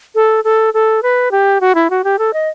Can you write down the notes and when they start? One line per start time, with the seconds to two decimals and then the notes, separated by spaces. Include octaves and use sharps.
0.15 A4
0.44 A4
0.74 A4
1.03 B4
1.31 G4
1.61 F#4
1.75 E4
1.90 F#4
2.04 G4
2.19 A4
2.33 D#5